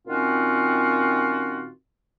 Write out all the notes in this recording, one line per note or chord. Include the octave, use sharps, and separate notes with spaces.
A#2 D#3 C4 C#4 F4 F#4